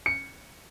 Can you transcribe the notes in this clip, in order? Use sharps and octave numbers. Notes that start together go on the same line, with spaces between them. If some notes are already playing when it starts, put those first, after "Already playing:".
C#7